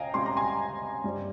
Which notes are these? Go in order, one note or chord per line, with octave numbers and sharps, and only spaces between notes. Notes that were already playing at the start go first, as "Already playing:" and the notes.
Already playing: C#2 D#5 F5 G5 G#5 A#5
C#2 C3 G3 C6
A#5
G#5 C6
G2 G3 C4